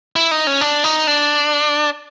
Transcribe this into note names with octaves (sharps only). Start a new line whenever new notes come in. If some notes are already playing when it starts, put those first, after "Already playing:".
E4
D#4
C#4
D4
D#4
D4